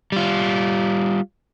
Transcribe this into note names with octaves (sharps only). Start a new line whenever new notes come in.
G3 F4